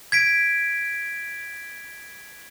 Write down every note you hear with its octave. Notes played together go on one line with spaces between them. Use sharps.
G#6 B6 D7